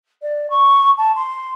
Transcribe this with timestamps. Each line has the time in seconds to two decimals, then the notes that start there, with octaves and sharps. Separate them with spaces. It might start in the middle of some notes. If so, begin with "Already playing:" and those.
0.22 D5
0.50 C#6
0.97 A5
1.15 C6